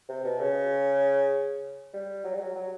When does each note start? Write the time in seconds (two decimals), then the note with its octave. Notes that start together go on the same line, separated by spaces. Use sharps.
0.09 C3
0.25 B2
0.40 C#3
1.93 G3
2.24 F#3
2.34 G3
2.39 F#3
2.55 F#3